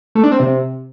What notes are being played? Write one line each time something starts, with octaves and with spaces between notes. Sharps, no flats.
A3
D4
C4
C3